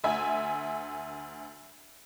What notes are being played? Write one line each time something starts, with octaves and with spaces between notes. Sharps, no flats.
D2 E5 G#5